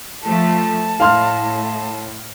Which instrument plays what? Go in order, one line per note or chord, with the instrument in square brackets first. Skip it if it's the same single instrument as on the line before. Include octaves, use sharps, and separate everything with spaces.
[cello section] F3 A3 [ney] A5
[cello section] A2 [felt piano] F5 C6 F6